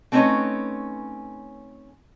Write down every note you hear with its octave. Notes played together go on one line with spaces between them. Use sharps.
A3 C4 C#4 D#4 B4 C#5